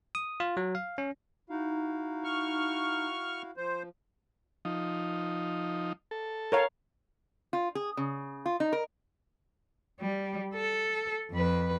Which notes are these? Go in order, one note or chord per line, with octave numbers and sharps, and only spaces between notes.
D#6
F4
F#3
F5
C#4
D#4 E4 F#4 F5
C#6 F6
F3 C5
F3 D#4
A4
A#4 C#5 F5
F4
G#4
C#3
F4
D#4
A#4
G3
A4
F2 B4